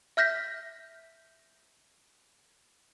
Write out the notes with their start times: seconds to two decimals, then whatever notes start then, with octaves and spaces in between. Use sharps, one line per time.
0.17 E5 F6 G6 A#6 B6